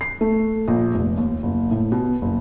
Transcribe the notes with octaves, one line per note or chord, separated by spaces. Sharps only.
C7
A3
A#1
F1
D#2
F#1
A2
B2
F#1